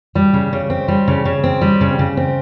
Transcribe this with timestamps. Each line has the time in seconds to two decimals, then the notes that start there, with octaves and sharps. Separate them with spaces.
0.15 G3
0.33 C#3
0.53 C#3
0.70 C4
0.88 G3
1.08 C#3
1.25 C#3
1.44 C4
1.61 G3
1.81 C#3
1.99 C#3
2.17 C4